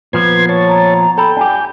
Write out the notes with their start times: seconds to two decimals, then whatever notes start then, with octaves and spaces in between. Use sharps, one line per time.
0.13 A#2 F3 B3 B4 C6 G#6
0.49 C#5 A5
0.69 A#5
1.18 A4 G5 B5
1.37 D4 G4 G#5